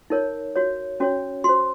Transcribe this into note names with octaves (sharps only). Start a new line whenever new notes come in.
D#4 A#4 C#5
F#4 C#5
C#4 F#4 C#5
F#4 C5 C6